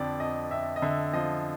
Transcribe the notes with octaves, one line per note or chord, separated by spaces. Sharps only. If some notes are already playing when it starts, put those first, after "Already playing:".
Already playing: F2 D3 D5
F2 D#5
F2 E5
D#5
D3 E5
F3 D#5